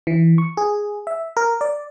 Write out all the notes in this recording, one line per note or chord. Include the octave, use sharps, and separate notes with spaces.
E3
C#6
G#4
E5
A#4
D5